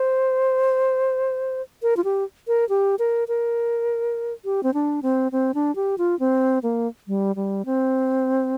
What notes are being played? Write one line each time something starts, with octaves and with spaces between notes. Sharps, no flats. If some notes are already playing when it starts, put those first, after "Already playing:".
Already playing: C5
A#4
F4
G4
A#4
G4
A#4
A#4
G4
C4
D4
C4
C4
D4
G4
F4
C4
A#3
G3
G3
C4